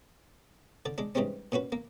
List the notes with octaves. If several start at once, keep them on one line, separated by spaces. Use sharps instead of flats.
D3 D5
G#3 D4
G#2 E3 G3 G#3 C4 C#4
A#2 C#4 F#4 B4
A#3